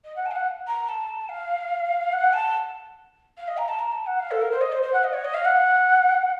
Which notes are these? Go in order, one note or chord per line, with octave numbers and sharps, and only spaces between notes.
D#5
F#5
A5
F5
F#5
A#5
A5
F5
F#5
A5
F5
D#5
A#5
A5
A#5
A5
F#5
F5
A4
A#4
C5
D#5
C5
C5
F#5
D#5
C#5
D#5
F5
F#5